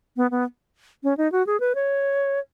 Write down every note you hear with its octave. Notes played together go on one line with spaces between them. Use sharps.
B3
B3
C#4
D#4
F#4
G#4
B4
C#5